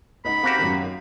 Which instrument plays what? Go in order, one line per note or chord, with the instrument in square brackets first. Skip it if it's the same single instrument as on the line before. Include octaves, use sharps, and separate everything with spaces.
[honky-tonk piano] C#2 D#4 F#5 [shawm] B5
[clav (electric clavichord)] A#3 F#4 G4 [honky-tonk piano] C4 D6
[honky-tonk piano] F#2 D#3